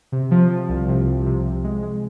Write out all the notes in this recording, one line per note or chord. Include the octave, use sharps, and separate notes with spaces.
C3
F3
F3
C2
C3
C2
C3
C3
G#3
G#3